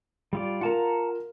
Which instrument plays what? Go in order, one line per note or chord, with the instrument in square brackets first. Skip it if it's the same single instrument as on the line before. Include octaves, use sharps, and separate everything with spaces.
[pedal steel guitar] G3 F4 D5
[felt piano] F4 A#4 [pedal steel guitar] F#5 A5 A#5